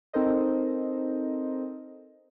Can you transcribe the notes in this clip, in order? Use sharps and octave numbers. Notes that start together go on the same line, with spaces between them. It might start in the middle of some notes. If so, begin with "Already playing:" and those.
C4 D#4 A4 A#4 C5 D#5